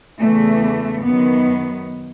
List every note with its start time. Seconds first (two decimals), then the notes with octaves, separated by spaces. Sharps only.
0.20 E2 C#3 E3 A3
1.03 F#2 D#3 B3